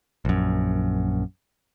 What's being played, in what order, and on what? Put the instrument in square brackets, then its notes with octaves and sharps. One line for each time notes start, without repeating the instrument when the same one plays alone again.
[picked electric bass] A#1 F#2